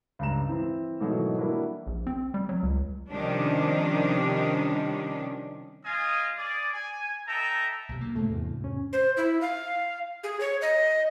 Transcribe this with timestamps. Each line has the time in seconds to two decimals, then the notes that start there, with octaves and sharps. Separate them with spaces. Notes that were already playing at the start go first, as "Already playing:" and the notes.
0.19 C#2 G2 A#5 E7
0.48 E3 C4 E4
1.00 G#2 B2 D#3 E3 F#3 A3
1.38 E3 G3 A#3 D4 E4 F#4
1.87 A#1
2.07 C4
2.34 G3
2.49 F#3
2.63 C#2
3.09 C3 D#3 F3 G3 C#4 D4
5.85 G#3 F4 D#5 F5 G#5 D#6
6.38 G#4 D5
6.73 G#5
7.27 A4 D#5 E5 G5 A5 A#5
7.89 B1 C3
8.01 D2 A#3
8.15 D2 G#2 C3 A3
8.30 E2
8.64 C#4
8.93 C5
9.17 E4
9.41 F5
10.24 G#4
10.40 C#5
10.62 D#5